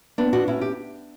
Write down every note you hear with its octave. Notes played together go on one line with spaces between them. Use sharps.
B3 D4
D4 F#4
C#4 E4
G4